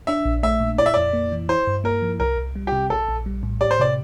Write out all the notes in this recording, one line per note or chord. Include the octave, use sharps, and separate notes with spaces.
D4 E5
A#1
A3 E5
A#2
E4 D5
E5
F2 D5
A#3
E3
E4 C5
G2
A#3 A#4
F3
C2 A#4
C2
G3
G4
C3
A#1 A4
A#1
G3
A2
G4 D5
C5
C3 D5